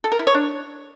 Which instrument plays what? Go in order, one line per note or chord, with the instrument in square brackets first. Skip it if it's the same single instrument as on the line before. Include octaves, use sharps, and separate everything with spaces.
[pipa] A4
A#4
E4
C#5
D4